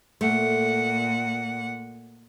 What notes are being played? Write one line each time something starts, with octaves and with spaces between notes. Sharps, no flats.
A#2 A3 F#5